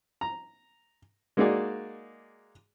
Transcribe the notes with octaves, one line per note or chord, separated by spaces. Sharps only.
A#5
G#3 A#3 D#4 F#4 G#4 D5